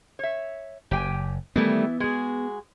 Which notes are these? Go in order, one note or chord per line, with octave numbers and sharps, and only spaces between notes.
C#5 E5
F#1 G4 G5 G#5
D#3 E3 G3 A3 B3 E4
G#3 F#4 G#4